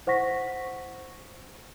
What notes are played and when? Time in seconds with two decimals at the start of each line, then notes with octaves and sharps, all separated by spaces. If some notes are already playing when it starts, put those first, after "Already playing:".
0.07 E4 C5 F#5 C#6 A#6 B6